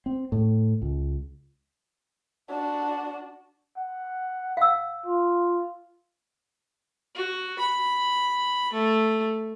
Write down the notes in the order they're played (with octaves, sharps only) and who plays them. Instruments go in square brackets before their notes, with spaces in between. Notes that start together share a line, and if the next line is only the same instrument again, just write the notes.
[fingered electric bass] C4
A2
C#2
[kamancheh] D4 F#4
[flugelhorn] F#5
[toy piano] F5 E6
[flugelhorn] F4
[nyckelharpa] F#4
B5
A3